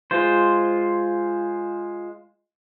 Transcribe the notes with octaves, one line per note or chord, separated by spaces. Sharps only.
G#3 F4 C5